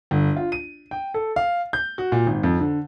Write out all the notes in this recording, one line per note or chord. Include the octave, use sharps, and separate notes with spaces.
G1
F4
D#7
G5
A4
F5
G6
F#4
A#2
G#1
F2
D3